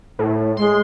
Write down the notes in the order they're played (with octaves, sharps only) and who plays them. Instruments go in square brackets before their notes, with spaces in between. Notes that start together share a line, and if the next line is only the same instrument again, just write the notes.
[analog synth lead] A2
[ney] G#3 [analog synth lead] C6